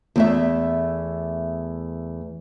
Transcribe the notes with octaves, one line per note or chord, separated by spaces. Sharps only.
E2 A3 E5